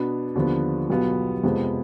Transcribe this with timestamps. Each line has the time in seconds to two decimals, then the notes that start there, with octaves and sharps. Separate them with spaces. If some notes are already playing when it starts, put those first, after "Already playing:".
Already playing: B2 B3 D4
0.35 D#2 D3 F3 B3
0.90 B1 B2 G3 B3 F4
1.43 F2 C3 F3 G#3 B3